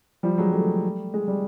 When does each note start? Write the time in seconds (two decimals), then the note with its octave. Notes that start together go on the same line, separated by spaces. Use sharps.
0.23 F3 G3
0.38 F#3 G#3
0.53 G3 A3
1.14 G#3
1.28 G3